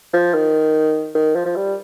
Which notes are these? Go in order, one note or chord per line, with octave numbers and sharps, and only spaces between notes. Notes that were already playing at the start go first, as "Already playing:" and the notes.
F3
D#3
D#3
F3
F3
G3